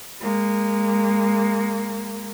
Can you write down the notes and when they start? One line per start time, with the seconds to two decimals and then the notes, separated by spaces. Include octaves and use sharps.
0.21 G#3 A#3